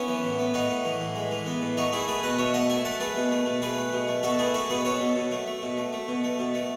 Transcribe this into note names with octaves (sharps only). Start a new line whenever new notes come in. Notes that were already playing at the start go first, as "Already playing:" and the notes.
Already playing: B3 C#4 E4
E3
A2
B3
A2 D#4 F#4
A2
E3
A2
G#3
E3
B3
A2
A3 D#4 F#4
A3 E4 G#4
A3 G#4 B4
B2 B4 D#5
B2 C#5 E5
A3 D#5 F#5
A3 E5 G#5
A3 F#5 A5
A3 G#4 B4
B2
A3
B2
A3 G#4 B4
A3
B2
A3
B2 F#4 A4
A3 E4 G#4
A3 F#4 A4
B2 G#4 B4
B2 A4 C#5
B2
B2
A3
A3
B2
A3
A3
B2
A3
B2
A3